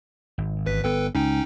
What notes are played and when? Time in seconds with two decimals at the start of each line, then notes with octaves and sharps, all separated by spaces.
0.38 G#1
0.66 A1 B4 B6
0.84 G1 B3 A4 B4 G5
1.15 C#2 C#4 D#4 G5